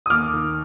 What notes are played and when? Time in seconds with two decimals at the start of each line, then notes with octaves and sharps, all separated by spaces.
0.06 D#6
0.10 D#2 D6 F6
0.34 D#3